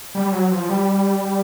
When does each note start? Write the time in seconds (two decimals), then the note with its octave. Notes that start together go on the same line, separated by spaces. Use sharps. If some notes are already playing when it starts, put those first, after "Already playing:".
0.15 G3
0.32 F#3
0.51 F3
0.69 G3